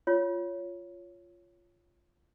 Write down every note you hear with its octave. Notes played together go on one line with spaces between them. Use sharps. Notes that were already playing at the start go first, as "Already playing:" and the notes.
F4 C#5